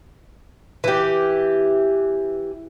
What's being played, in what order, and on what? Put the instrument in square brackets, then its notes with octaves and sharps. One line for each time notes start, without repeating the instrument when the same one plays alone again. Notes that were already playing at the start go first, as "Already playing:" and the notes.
[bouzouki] E3 G4